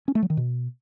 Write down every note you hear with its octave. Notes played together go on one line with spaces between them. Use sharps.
C#4
A3
F#3
D#3
B2